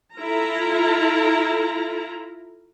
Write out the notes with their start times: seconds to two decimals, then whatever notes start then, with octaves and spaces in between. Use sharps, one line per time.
0.17 E4 F4 A4 A#5